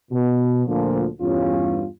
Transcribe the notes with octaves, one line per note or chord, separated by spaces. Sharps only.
B2
D2 A#2 D3 F3
E2 G2 C#4 F4